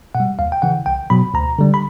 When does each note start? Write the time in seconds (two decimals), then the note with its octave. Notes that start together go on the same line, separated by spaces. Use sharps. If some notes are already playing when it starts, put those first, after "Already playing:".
0.15 B2 F#5
0.20 G3
0.39 D#2 F5
0.52 G5
0.62 C#3 E3 F#5
0.86 C2 G5
1.10 B2 F#3 B5
1.34 D2 A#5
1.59 D3 G3
1.74 B5